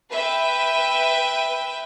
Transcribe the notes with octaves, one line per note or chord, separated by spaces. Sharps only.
B4 E5 G5